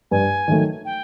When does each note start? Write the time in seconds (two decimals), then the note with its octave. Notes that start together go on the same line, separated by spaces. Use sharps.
0.11 G2 G#5
0.48 D#3 F#3 A3
0.85 G5